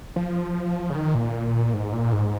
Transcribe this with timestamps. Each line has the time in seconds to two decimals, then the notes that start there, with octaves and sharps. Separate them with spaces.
0.16 F3
0.90 C#3
0.95 D#3
1.14 A#2
1.73 G#2
1.93 A#2
2.13 G#2